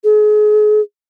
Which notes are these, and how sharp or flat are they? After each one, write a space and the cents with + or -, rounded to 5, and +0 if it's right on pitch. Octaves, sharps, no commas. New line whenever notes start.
G#4 +35